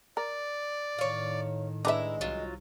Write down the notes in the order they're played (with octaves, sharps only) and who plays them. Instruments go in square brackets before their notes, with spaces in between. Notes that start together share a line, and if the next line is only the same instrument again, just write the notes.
[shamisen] A#4 [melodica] D5
[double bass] A2 D#3 [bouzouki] C#5 F5
[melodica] G#3 [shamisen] D4 B4 E5 [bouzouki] E4 A#5
[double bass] C2 [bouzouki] F#3 F4